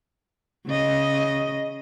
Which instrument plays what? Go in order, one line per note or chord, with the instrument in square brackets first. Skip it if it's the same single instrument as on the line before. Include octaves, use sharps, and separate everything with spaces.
[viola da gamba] C#3 D#5